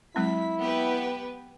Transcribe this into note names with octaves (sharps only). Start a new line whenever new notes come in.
F#3 G#3 C4 E4 B6
B3 G4 B4